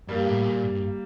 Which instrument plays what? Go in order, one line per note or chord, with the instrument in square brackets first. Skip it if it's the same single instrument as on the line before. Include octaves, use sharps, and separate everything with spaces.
[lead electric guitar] G2 [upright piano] G3 A#3
[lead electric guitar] A2
A#2
G2